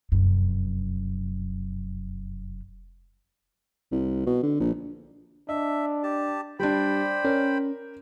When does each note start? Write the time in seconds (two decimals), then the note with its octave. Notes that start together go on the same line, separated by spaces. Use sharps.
0.12 F1 F#2
3.92 C2
4.26 B2
4.43 D3
4.60 A#1
5.49 D4 D#5 E5
6.03 G4 A5
6.59 G3 D4 C5 D5 G5 B5
7.25 C#4 A#4